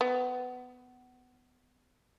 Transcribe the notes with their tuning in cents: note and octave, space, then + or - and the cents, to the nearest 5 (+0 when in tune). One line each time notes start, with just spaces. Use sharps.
B3 +20